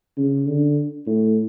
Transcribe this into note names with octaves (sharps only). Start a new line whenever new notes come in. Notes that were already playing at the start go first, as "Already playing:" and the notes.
C#3
D3
A2